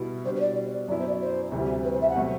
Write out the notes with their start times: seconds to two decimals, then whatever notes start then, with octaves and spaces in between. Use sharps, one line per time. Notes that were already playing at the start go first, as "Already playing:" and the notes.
Already playing: B2 G3 B3 E4
0.25 B2 G3 D4 C5
0.36 C5
0.40 D5
0.88 F#2 F#3 B3 E4 D5
0.98 C5
1.07 D5
1.21 C5
1.52 D2 C3 E3 G3
1.84 B4
1.93 C5
2.01 E5
2.09 F#5
2.16 B2 F#3 A3 C4